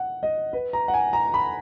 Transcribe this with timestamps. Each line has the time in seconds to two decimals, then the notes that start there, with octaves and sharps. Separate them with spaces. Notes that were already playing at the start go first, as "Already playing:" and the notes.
Already playing: F#5
0.23 D#5
0.53 B4
0.73 A#5
0.88 F#5
0.94 G#5
1.13 A#5
1.34 B5